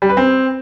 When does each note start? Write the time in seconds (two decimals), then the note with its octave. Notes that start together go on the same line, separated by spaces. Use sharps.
0.02 G3
0.09 B4
0.17 C4